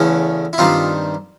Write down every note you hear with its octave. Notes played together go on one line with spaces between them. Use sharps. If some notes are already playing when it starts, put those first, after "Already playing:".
Already playing: E2 C#3 E3 A3 C#4
E4
G2 D#3 G3 C4 D#4 F4